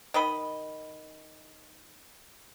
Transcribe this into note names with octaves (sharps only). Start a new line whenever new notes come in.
D#3 D#5 B5